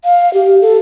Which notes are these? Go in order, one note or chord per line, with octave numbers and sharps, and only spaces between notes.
F5
G4
A4